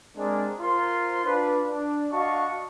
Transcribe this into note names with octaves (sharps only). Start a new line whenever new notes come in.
G#3 C4 D4 G#4 A#4 D5
F4 A#4 C5 C6
D4 F4 B4
D4
D4 F#4 D#5 F5 A5 C#6